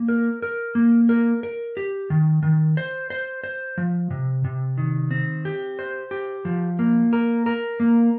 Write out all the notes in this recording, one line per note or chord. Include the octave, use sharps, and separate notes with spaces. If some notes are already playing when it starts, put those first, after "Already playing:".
Already playing: A#3
A#4
A#4
A#3
A#4
A#4
G4
D#3
D#3
C5
C5
C5
F3
C3
C3
D#3
C4
G4
C5
G4
F3
A#3
A#4
A#4
A#3